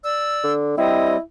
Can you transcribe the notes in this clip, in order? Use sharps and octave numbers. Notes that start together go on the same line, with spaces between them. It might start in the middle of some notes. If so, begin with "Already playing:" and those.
D5 E6
D3
G3 C4 E4 D#5